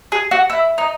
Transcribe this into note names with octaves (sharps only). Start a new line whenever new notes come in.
G#4
F#4
E4
D#4